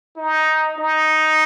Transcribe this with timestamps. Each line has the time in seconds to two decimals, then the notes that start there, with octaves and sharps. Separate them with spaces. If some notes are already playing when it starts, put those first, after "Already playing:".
0.17 D#4
0.78 D#4